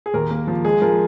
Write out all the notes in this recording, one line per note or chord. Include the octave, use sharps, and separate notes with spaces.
G#4
D#2 A#4
A#3
F3
G#3 G#4
F3 A#4